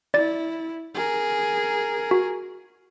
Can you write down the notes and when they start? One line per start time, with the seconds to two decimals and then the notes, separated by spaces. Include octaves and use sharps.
0.14 E4 D5 A6
0.94 G#4 A#4
2.11 F#4